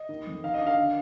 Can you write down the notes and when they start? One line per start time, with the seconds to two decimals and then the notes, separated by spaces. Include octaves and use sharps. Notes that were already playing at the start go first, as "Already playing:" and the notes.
Already playing: D#5
0.09 D#3
0.27 F2
0.44 D#3 F5
0.54 D#5
0.60 D4
0.67 F5
0.77 D3